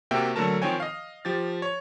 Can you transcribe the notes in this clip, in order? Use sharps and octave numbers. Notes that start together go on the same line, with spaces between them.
C3 A#3 F#4 E5 G5
D3 F#3 A3 A#4 A5
D#3 F3 C4 C#5 G5 G#5
D#5 F5
F3 G4 A6
C#5